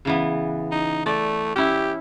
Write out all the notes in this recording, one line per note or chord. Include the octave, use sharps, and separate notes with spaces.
C#3 E3 B3
D#4
A3 D5
C#4 E4 G4